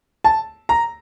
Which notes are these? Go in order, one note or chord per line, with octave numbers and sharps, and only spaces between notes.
A5
A#5